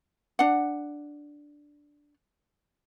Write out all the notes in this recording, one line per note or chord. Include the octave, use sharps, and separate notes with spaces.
D4 F#5